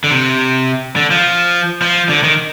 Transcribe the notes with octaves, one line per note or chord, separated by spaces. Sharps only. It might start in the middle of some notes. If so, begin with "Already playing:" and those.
D3
C3
D3
F3
F3
D3
D#3